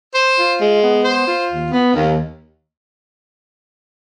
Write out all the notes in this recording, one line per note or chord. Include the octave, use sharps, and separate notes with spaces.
C5
F4
G#3
B3
C5
F4
D#2
B3
D#2